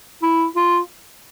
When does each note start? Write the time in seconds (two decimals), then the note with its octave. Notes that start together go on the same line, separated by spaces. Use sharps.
0.23 E4
0.56 F4